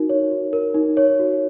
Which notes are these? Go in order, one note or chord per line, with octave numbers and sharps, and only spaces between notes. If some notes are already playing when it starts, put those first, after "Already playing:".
Already playing: D#4 F#4 A#4
C#5
F#4
A#4
D#4
C#5
F#4